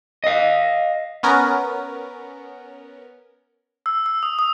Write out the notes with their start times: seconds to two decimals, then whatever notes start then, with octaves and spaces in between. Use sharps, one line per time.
0.24 D#5 F5
1.23 B3 C#4 A#4
3.86 E6
4.06 E6
4.23 D#6
4.39 D#6